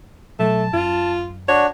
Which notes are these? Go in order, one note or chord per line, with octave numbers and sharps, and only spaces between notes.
B2 F#3 A3 A5
F#2 F4
D4 F#4 C#5